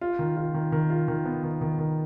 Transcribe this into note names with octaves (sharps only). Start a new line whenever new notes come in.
F4
D#3
F4
D#3
D#3
F4
D#3
B3
D#3
D#3
D#3